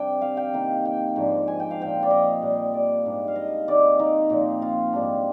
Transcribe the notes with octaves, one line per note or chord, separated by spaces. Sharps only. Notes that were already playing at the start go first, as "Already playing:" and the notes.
Already playing: C3 G3 D4 G5
F5
G5
C3 D#3 A#3
G5
G#2 F3 A#3 D4
G#5
G5
F5
A#2 F3 C4 G5
D5
D#5
A#2 G3 A#3
D5
G#2 G3 A#3 D4
F5
D#5
D#3 G#3 C4 D5
D#4
A#2 F3 C4
F4
G#2 G3 D4